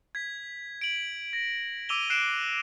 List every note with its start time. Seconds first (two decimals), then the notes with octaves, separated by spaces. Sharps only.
0.15 G#6 B6
0.81 D7 F#7
1.33 A#6
1.89 D6 E6 D#7 F7 G7
2.10 F#6 C7 D7 E7